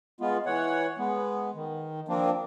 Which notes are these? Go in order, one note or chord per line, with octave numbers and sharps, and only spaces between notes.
G#3 B3 F4
E3 C#5 F#5
G#3 B3
D#3
F3 A#3 C4 D4